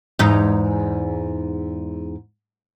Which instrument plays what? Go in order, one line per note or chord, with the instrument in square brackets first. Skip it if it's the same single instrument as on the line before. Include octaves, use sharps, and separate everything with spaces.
[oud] E2 G#2 D#4